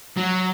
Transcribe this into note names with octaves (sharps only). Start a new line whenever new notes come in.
F#3